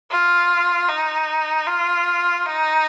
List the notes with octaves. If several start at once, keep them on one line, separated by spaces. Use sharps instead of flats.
F4
D#4
F4
D#4